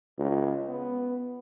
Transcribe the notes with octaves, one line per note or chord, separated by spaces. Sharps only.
C#2
B3